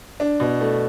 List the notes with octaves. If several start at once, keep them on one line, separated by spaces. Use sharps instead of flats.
D4
B2
A3